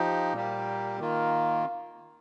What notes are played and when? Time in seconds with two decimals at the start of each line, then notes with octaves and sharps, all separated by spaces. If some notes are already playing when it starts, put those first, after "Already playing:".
Already playing: F3 D#4 G4
0.33 A#2 G3 A#3 G4
0.99 D#3 A#3 F4